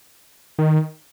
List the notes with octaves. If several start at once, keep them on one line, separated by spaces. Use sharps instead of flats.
D#3